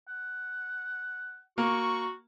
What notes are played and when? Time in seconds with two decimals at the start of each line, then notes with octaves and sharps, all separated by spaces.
0.08 F#5
1.58 A#3 F#4 C#6